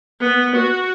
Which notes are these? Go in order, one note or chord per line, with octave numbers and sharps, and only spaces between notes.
B3
F#4